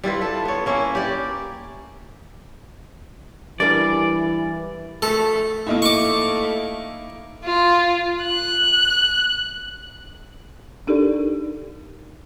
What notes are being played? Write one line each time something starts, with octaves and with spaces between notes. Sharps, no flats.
G3 E4 F4 B4
A4
B3 C#5
A#3 C#4 E4
G4 D5
E3 G3 D4 A#4 D5
A3 A4
A3 A#3 D#4 E4
C#6 D6
F4
F#6
D4 D#4 G4 A4 A#4 D5